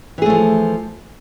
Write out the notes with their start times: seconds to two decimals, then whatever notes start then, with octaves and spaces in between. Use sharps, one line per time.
0.18 E3
0.22 G#4
0.26 A3
0.30 F3